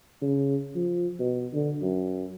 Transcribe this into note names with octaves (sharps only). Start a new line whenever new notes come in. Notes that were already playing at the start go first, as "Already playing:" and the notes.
C#3
F3
B2
D3
F#2